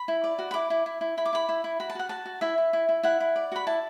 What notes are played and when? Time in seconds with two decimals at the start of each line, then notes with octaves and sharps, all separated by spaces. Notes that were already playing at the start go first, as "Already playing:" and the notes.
Already playing: B5
0.08 E4
0.24 D5
0.39 F#4
0.51 B5
0.54 E4 D6
0.70 E4
0.86 E4
1.01 E4
1.17 E4 B5
1.25 D6
1.33 E4 B5
1.49 E4
1.64 E4
1.80 F#4 B5
1.90 A5
1.95 F#4 F#5
2.09 F#4 A5
2.26 F#4
2.41 E4 E5
2.58 E4
2.73 E4
2.89 E4
3.03 E4 F#5
3.20 E4
3.36 D5
3.52 F#4 B5
3.67 E4 A5